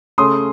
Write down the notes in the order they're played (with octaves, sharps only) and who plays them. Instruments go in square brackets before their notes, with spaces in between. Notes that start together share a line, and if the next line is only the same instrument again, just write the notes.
[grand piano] C#3 A3 C#4 C6 D#6